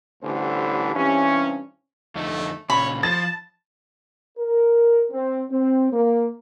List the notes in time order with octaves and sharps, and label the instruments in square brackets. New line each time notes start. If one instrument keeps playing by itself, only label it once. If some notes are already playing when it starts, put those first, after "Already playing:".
[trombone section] A1 D2 D3 E3 G3 C5
G2 C3 E3 C#4
[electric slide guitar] F2 D3 D#4 [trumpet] A3
[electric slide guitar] A#2 C#3 [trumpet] C#5 [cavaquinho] B5
[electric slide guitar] F3 [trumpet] A5 [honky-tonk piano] A6
[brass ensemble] A#4
C4
C4
A#3